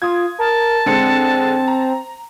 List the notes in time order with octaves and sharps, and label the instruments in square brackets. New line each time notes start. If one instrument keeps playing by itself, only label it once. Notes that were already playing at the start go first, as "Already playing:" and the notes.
[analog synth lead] F4 [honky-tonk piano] D#6 G#6
[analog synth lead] A#4 [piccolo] A5
[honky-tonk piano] D3 G#3 C#7 [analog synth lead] C4
[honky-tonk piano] A#5